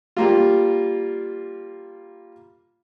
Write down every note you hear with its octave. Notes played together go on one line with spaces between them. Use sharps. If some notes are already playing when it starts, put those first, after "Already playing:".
G3 A#3 F4